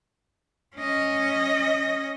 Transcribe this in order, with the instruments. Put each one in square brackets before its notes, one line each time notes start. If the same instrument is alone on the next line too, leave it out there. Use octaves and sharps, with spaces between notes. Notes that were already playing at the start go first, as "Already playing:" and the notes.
[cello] C#4 D#5